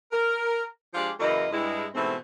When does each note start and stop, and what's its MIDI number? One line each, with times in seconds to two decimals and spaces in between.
0.12 0.64 70
0.94 1.10 53
0.94 1.10 56
0.94 1.10 62
0.94 1.10 65
0.94 1.10 67
1.20 1.46 42
1.20 1.46 49
1.20 1.46 52
1.20 1.46 58
1.20 1.46 64
1.20 1.46 75
1.51 1.85 43
1.51 1.85 56
1.51 1.85 64
1.95 2.15 44
1.95 2.15 47
1.95 2.15 52
1.95 2.15 57
1.95 2.15 60